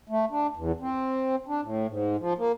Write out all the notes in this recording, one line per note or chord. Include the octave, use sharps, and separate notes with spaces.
A3
D4
E2
C4
D4
A2
G#2
F3
A#3